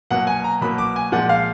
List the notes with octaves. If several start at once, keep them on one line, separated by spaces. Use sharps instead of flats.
B2 F#3 A#3 F#5
G#5
A#5
B2 F#3 A#3 B5
D6
G#5
A#2 F3 G#3 F#5
F5